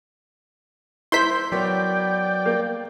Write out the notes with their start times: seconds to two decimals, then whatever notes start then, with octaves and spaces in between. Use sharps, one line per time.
1.12 E4 C5 C6 G6 B6
1.52 F#3 B3 A#4 D5 G5
2.46 A#3